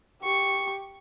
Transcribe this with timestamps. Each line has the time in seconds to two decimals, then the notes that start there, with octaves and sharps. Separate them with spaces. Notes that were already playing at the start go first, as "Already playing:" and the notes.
0.22 G4 C#6